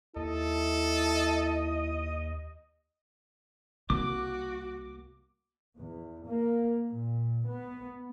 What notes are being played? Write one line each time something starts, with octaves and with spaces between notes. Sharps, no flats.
D#2 E4 A4 D#5
C2 A#3 F#4 D6
E2
A#3
A#2
B3